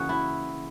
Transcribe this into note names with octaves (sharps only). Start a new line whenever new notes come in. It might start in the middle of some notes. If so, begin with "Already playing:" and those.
Already playing: C#3 E3 A#3 F#4 G#4
E4